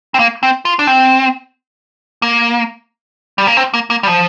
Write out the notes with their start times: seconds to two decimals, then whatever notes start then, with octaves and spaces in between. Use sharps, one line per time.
0.14 C4
0.19 A#3
0.43 C4
0.65 F4
0.79 D4
0.87 C4
2.22 A#3
3.38 G3
3.47 A#3
3.57 C4
3.74 A#3
3.90 A#3
4.03 G3
4.07 F3